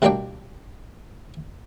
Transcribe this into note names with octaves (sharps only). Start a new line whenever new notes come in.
B2 G3 A#3 D4 D5 G5